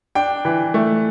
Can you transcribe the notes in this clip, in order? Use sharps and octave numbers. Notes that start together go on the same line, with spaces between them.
D4 G5
E3
A3